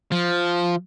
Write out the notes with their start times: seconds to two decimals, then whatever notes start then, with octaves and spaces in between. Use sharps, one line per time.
0.12 F3